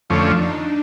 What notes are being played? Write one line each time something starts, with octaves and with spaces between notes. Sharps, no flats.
F2 D3 F3 A3 C#4 D4
D#4